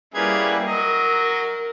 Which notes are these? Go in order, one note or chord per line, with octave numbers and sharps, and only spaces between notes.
G3 A#3 C#4 E4 G#4 B4
F#3 A#4 D#5